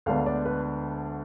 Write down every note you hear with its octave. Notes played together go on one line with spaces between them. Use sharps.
D2 D3 G#3 B3 D4 F5
D5
B4